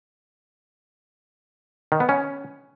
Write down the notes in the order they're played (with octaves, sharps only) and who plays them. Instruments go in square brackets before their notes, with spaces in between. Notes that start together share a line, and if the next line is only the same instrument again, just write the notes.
[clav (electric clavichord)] D#3
B3
C#4